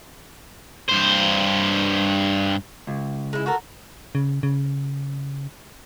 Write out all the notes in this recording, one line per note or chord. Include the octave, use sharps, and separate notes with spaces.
G2 C5
C#2
G#3 E4
F#4 A4 A#4
C#3
C#3